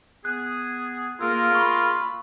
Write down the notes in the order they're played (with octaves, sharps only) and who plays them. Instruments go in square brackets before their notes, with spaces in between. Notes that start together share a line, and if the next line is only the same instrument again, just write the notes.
[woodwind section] B3 G#4 [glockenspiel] F#6
[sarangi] A#3 [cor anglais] F4 [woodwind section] G#4 A#4 [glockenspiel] E6
[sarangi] B5 [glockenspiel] C#6